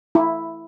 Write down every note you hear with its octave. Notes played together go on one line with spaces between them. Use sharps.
E4